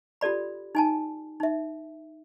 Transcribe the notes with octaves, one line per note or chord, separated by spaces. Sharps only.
F4 G4 A4 D5 B5
D#4 G#5 A5
D#4 E5